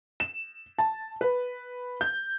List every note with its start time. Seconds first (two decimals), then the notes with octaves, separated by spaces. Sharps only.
0.20 E7
0.78 A5
1.21 B4
2.01 G6